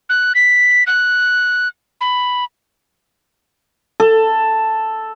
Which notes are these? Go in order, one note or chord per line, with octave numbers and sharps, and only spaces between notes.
F#6
B6
F#6
B5
A4